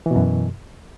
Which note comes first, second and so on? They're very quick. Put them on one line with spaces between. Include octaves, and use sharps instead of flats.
E3 B2 F#2